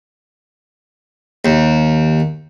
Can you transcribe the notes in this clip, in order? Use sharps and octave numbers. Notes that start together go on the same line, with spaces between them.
D#2